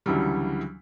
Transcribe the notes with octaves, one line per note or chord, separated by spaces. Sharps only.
D2 C#3 E3 F#3 G3